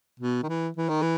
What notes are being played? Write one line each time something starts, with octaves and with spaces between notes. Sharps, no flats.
B2
D#3
E3
E3
D#3
E3